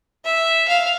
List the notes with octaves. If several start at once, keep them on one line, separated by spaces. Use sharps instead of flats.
E5
F5